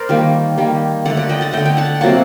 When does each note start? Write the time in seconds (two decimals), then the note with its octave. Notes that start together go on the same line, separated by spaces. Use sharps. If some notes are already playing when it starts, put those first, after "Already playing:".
Already playing: A#4 C5 D5
0.09 D#3 G3 A#3
0.58 D#3 G3 A#3
1.05 D3 A3 D5 F#5
1.17 D5 F#5
1.29 D#5 G5
1.41 F#5 A5
1.53 D3 A3 D#5 G5
1.66 G5
1.77 F#5 A5
2.01 C3 F#3 A#3 F#5 A5